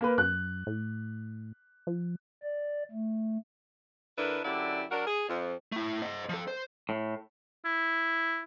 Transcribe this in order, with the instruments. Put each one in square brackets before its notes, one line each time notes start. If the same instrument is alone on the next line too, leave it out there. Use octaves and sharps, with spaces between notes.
[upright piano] A#3 A#4 B4
[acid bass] F#2 [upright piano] F#6
[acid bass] A2
F3
[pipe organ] D5
A3
[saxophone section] D3 D4 E4 A#4 B4
F#2 D3 E4 G4 D5
F#3 D4 F#4 A#4
G#4
F2
[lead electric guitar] A3 E4
C5 D#5
F3 A4
C5
[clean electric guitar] A2
[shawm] E4